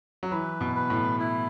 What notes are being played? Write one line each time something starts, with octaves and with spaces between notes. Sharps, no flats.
F#3
E3 B4
B2
B4
A2
E4